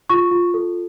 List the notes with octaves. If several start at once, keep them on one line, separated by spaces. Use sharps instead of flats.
F4 C#6
F4
A4